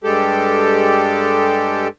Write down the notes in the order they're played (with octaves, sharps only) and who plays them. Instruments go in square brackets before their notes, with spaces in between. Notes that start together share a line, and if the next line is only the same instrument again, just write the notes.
[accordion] G2 G#3 G4 A4